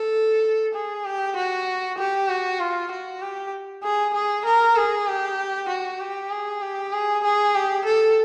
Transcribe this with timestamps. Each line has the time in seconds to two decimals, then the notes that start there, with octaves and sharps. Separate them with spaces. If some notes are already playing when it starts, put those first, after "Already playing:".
Already playing: A4
0.74 G#4
1.05 G4
1.36 F#4
1.98 G4
2.29 F#4
2.60 F4
2.91 F#4
3.22 G4
3.83 G#4
4.14 G#4
4.46 A#4
4.76 G#4
5.07 G4
5.69 F#4
6.00 G4
6.31 G#4
6.62 G4
6.92 G#4
7.24 G#4
7.55 G4
7.85 A4